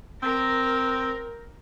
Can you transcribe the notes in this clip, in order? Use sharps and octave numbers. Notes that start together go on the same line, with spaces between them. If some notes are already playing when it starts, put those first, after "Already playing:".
C4 A#4